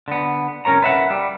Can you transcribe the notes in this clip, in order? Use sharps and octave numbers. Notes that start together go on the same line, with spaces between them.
D3 B3
C2 C#4 A#4 C#5 A#5
B4 E5 F#5
G3